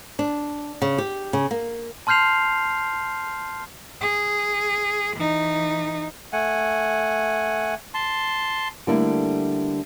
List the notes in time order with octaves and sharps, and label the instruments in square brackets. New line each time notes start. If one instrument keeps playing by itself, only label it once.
[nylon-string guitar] D4
C#3
G4
C#3
A#3
[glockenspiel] A5 C6 F6 G6 C7 F7
[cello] G#4
E3 D#4
[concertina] A3 F#5 G#5
A5 C6
[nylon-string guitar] D3 G3 A3 A#3 D4 E4